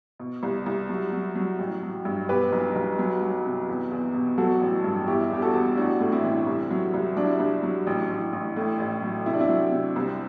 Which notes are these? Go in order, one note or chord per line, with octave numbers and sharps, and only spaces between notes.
B2
C2
C2
F#3
F#3
F#3
A1
F#3
G2
B2 G4 B4
B1
B1
F#3
F#3
C3
E2
E2
B2
F#3 F#4 A4
A1
G2
E2 E4 G4
E2 G4
F#4 A4
E2
A1 D4 F#4
A2
C4 E4
E3
C2
F#3
C2
F#3 D4
E4
D4
C2
F#3
A1
A1
A1
A2
A1
F#3
C3 E4
D4
C4 E4
F#3
C3
C2 C4